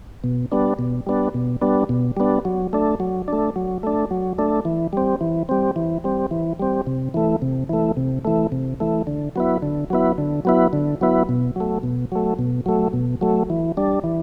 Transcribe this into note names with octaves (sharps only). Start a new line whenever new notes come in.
B2
G3 B3 D4
B2
G3 B3 D4
B2
G3 B3 D4
B2
G3 B3 D4
F#3
A3 D4
F#3
A3 D4
F#3
A3 D4
F#3
A3 D4
E3
G3 C4
E3
G3 C4
E3
G3 C4
E3
G3 C4
C3
E3 A3
C3
E3 A3
C3
E3 A3
C3
E3 A3
D3
F#3 B3 E4
D3
F#3 B3 E4
D3
F#3 B3 E4
D3
F#3 B3 E4
B2
F#3 A3
B2
F#3 A3
B2
F#3 A3
B2
F#3 A3
E3
G3 D4
E3